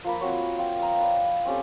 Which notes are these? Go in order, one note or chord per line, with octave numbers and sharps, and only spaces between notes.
F3 A#3 B5
C4 F#4 C#5
F3 F4 G5
F5 A#5 D#6
B4 D5
C4 C#4 G4 A4